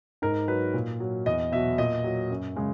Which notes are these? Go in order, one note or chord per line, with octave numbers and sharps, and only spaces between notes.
G#2 A#4
F#3 B4
A#2
F#3
E2 D#5
B2 F#3 E5
A#2 D#5
F#3
F#2
C#3 G#3